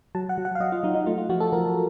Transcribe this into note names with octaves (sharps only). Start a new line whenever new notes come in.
F#3 A5
F#5
F#3
F#5
F5
F#3 D#5
F4
F#3 D#4
D#4
A3 F4
F4
F3 F#4
A4
F3 A#4